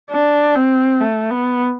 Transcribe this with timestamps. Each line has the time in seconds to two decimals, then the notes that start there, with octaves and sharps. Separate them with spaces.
0.11 D4
0.55 C4
1.01 A3
1.31 B3